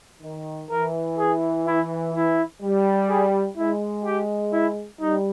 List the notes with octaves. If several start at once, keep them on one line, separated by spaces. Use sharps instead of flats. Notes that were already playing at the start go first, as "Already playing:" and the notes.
D#3
E3 A#4
G#4
E4
E4
G3
G#4
G#3 E4
G4
E4
G3 D#4